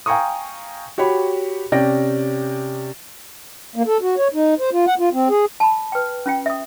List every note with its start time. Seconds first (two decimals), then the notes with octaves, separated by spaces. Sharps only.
0.06 F5 G5 G#5 A#5 C#6 D#6
0.98 F#4 G4 C#5 B5
1.72 C3 C#4 D5 G5 A#6
3.76 A#3
3.87 A4
4.01 F#4
4.17 C#5
4.34 D#4
4.59 C5
4.73 F4
4.87 F#5
4.99 F4
5.13 C4
5.29 G#4
5.60 A5 B5
5.92 B4 G5
6.26 C#4 F4 G5
6.46 E5 D#6